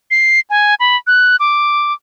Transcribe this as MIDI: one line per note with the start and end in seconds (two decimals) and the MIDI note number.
0.11 0.40 96
0.50 0.75 80
0.80 0.96 83
1.07 1.36 90
1.40 1.93 86